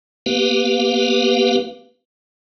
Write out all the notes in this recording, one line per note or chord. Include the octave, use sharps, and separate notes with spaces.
A#3 B3 G4 B4 F5